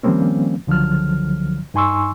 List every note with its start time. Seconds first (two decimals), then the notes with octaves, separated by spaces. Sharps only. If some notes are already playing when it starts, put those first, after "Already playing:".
0.03 D#3 F3 G3 A#3 C4 C#4
0.67 C#2 D3 F3 F#3 F6
1.74 G2 D#4 G#5 C6 C#6 E6